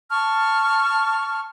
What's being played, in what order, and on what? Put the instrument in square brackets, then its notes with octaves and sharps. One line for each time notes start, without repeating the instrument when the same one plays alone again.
[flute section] A5 C#6 F6